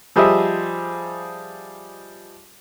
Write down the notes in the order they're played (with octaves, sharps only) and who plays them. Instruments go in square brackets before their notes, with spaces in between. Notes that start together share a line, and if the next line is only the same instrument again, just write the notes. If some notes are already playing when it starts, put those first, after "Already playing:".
[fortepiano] F3 G3 G#4 C5 D#5 E5